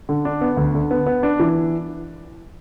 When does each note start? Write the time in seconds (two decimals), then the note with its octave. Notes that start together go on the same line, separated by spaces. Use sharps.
0.09 D3
0.25 D4
0.41 B3
0.57 D2
0.74 D3
0.91 B3
1.06 B3
1.23 D4
1.40 E3